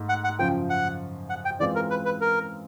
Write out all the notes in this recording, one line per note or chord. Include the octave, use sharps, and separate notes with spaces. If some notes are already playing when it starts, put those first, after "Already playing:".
Already playing: G#2 A3
F#5
F#5
F#2 C#3 F3 G5
F#5
F#5
G5
E3 G#3 C4 F4 D5
A#4
B4
B4
A#4